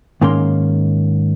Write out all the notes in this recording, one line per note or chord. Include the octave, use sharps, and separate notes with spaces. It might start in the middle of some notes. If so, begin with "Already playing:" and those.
G#2 D#3 A#3 C#4 C6